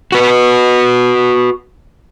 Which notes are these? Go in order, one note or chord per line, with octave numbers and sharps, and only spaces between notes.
F#4 B4